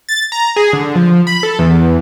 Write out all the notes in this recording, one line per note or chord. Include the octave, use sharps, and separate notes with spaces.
A6
A#5
G#4
D3
F3
B5
A4
E2